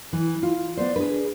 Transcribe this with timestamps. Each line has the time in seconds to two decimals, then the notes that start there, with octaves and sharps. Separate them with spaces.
0.13 E3 E4
0.43 F4
0.77 B3 C5 D5
0.96 D4 G#4 B4